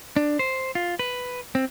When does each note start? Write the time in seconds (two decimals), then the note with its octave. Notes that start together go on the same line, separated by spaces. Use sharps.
0.16 D4
0.39 C5
0.75 F4
0.99 B4
1.55 C4